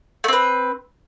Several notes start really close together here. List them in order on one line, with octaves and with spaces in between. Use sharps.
A3 C4 B4